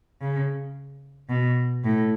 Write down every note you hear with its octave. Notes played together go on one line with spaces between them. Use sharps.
C#3
B2
A2